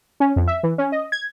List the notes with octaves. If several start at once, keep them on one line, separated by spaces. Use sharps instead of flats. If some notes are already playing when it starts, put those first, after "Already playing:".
C#4
F2
E5
E3
C#4
D#5
G#6